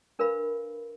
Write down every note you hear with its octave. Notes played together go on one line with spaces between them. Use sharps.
D4 A#4 B4 F5 B5